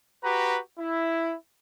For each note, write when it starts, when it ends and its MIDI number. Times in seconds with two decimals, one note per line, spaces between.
0.24 0.59 66
0.24 0.59 67
0.24 0.59 71
0.24 0.59 82
0.79 1.34 64